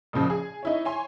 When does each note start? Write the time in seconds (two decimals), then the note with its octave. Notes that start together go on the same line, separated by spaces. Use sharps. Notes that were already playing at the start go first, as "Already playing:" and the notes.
0.13 A1 A#2 C#3 F3
0.30 G#4
0.63 D#4 E4 C#5
0.85 C#5 G#5 C6